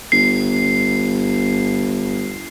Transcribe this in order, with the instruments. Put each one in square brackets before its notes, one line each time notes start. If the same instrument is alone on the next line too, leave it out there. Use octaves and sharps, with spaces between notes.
[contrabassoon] G1 [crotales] C7